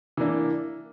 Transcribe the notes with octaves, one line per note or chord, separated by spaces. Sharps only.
E3 A#3 D4